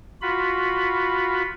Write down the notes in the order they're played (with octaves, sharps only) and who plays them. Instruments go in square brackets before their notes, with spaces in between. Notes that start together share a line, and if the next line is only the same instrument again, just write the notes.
[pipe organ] F4 F#4 B5